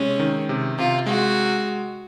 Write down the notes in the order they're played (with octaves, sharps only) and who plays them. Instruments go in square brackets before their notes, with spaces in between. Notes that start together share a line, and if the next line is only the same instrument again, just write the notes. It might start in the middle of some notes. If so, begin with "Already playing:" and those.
Already playing: [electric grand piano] C3 G#3 [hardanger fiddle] C#4
[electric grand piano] D#3
C3
[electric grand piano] C3 [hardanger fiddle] F4
[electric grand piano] G#3 [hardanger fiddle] F#4